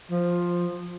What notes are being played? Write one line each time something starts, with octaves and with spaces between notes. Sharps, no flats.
F3